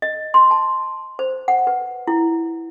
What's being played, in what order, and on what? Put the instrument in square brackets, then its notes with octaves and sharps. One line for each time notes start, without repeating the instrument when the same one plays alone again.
[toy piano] D#5
C6
A5
C5
F#5
B4
E4